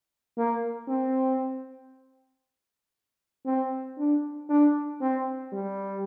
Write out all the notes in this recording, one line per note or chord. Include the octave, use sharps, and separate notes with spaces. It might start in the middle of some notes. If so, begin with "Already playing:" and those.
A#3
C4
C4
D4
D4
C4
G3